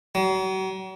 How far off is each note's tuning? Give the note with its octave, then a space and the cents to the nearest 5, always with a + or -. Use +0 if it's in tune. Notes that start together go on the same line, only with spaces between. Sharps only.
F#3 +40